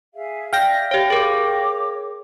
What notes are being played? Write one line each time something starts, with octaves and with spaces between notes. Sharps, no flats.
G#4 E5 F5
D5 E5 F5 G5 A#6
G4 C#5
G#4 A#4 C#5 D6